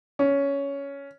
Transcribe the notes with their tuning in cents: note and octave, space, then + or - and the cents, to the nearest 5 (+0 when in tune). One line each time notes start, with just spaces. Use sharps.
C#4 +10